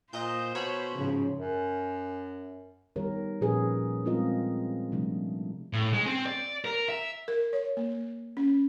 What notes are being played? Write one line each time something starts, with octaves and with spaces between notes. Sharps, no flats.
A#2 C5 D#5 G6
B2 C#5 B5
G#2 C#3 F3
F#2
D#3 G3 B3 G4 A#4 C#5
A#2 F3 C#4 G#4 A#4 B4
G3 G#3 C4 F4 A#4 D#5
C3 F3 G3 A3 D4
A2
G#3
C4
D5
A#4
E5
A#4
C#5
A#3
C#4